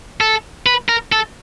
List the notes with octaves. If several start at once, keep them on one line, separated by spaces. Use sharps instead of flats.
A4
B4
A#4
A4